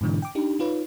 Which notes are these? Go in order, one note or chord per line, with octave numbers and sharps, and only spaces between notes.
G#2 B2 D3 E3
G5 D6
D4 D#4 G4
D#4 F4 B4 C#5